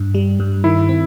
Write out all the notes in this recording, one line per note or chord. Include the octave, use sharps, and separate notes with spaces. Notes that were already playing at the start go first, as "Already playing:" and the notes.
Already playing: G2
G3
G2
D#3 E4
C4